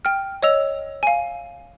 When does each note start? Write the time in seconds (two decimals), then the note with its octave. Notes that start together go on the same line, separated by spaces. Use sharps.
0.05 G5 F6
0.43 C#5 D#5 E6 F7
1.03 F5 G#5